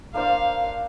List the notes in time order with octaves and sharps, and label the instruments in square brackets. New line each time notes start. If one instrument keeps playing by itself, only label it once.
[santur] A#3 D4 C5 [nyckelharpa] F5